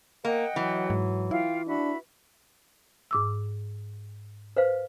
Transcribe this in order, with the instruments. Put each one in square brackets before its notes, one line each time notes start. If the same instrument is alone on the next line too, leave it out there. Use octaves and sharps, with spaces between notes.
[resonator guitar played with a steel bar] A#3 [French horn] A#4 [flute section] D#5 F#5 G5
[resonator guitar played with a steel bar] E3 [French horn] F#3
[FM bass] G#2
[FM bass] E4 [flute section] F4 F5 G5
[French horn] D4 [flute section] F#4 E5 B5
[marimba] G#2 D6 E6
[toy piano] B4 C5 F5